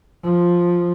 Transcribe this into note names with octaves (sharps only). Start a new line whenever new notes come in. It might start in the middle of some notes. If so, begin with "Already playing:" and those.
F3